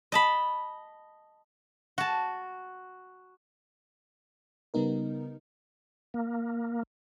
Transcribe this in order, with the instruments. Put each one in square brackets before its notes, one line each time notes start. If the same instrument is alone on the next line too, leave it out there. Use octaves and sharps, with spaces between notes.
[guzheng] D#5 A5 B5
F#4 A5
[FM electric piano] C#3 G3 B3 D#4 A#4
[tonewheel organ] A#3